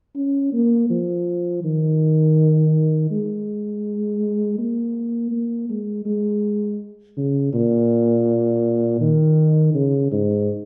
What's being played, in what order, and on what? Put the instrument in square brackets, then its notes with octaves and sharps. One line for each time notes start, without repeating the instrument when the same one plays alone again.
[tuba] C#4
A#3
F3
D#3
G#3
A#3
A#3
G#3
G#3
C#3
A#2
D#3
C#3
G#2